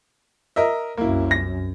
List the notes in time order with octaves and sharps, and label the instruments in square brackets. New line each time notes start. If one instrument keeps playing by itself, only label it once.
[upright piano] A#4 D#5 E5
[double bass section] C2 F#2 [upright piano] A#3 E4
[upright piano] A#6